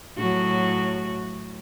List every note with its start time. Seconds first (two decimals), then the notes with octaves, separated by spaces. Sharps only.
0.17 A2 F#3 F#4